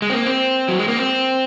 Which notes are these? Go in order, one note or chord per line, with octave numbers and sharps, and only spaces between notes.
G#3
C4
A#3
C4
F#3
G#3
A#3
C4